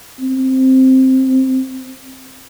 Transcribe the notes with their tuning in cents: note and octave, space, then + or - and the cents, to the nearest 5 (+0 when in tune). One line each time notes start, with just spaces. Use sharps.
C4 +5